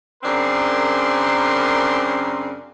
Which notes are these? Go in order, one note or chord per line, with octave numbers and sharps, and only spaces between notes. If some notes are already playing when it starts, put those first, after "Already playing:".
F#2 C#3 C4 D4 A#4 C6